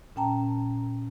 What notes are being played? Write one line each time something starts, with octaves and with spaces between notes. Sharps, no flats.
A#2 C#4 G5 A5 A#5